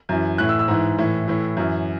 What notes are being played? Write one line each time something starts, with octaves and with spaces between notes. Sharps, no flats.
F#2 E3
A2 E3 F#6
E6
E6
G#2 E3
A2 E3
A2 E3
F#2 E3